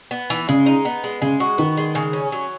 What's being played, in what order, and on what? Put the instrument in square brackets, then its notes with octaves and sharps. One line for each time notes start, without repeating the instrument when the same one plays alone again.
[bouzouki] B3
E3
[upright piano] C#3 [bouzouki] G#3
[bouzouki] D#4
B3
G#3
[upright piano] C#3 [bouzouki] G#3
[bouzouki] F#4
[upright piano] D#3 [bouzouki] B3
[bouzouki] G#3
C#3
C#4
F#3